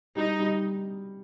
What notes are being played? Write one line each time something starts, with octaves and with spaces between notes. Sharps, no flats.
G3 D#4
G3